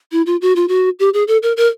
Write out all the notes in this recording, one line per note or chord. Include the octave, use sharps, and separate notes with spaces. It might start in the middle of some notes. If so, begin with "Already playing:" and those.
E4
F4
F#4
F4
F#4
G4
G#4
A4
A#4
A#4